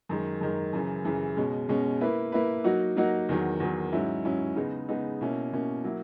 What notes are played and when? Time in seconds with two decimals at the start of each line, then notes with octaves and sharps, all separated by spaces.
0.09 F#2 D#3 G#3
0.41 F#2 D#3 G#3
0.73 F#2 C#3 E3
1.05 F#2 C#3 E3
1.37 B2 G#3 C#4
1.69 B2 G#3 C#4
2.01 A#3 E4 B4
2.32 A#3 E4 B4
2.64 F#3 A#3 D#4 F#4
2.97 F#3 A#3 D#4 F#4
3.29 E2 D#3 F#3
3.60 E2 D#3 F#3
3.92 G#2 F#3 C#4 E4
4.25 G#2 F#3 C#4 E4
4.56 C#3 G#3 B3 D#4
4.89 C#3 G#3 B3 D#4
5.21 B2 A#3 C#4 E4
5.53 B2 A#3 C#4 E4
5.84 F#3 A#3 E4